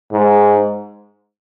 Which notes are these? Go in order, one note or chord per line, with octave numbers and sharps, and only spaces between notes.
G#2